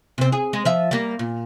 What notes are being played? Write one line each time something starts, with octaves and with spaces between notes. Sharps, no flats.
C3 C4
G#4
G#3
F3 E5
G3 A#3
A#2